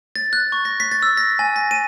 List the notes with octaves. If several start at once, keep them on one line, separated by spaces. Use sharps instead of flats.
A6
F#6
C#6
A#6
B6
A6
E6
A#6
G#5
A#6
D#7